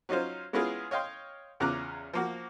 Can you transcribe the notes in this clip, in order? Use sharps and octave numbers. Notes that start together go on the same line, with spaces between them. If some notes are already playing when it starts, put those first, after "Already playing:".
F#3 C#4 D#4 F4 C5
G#3 B3 C#4 E4 F4 G#4
C#5 D#5 F5 G5 C6
E2 C#3 F4 A#5 D6 F#6
F3 A#3 F#4